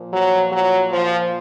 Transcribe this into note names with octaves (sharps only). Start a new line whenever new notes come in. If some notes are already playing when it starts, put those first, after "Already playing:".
Already playing: A#2 F3
F#3
F#3
F3